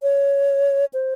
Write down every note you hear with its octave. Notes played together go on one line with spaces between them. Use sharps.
C#5
C5